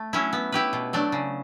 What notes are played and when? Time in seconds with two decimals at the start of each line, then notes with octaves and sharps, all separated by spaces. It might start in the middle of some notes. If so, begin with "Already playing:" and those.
Already playing: A3
0.13 F#3 C#4 E4
0.33 B3
0.52 E4 G4 B4
0.73 B2
0.93 F#3 A3 D4
1.12 C#3